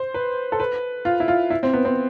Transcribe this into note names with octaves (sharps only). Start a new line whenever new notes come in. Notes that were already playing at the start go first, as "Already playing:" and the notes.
Already playing: C5
B4
A4
B4
F4
E4
F4
E4
C4
B3
C4